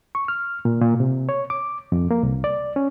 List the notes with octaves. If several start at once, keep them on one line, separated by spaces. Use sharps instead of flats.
C#6
F6
A#2
A#2
C3
C#5
D6
F2
A#3
C2
D5
C#4